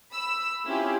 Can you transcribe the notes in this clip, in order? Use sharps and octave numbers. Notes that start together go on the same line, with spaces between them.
B5 E6
C4 C#4 E4 F4 G4 G#4